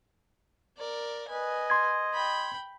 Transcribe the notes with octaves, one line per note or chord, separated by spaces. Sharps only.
A#4 D5
B4 D#5 G#5
C6 G#6
G5 B5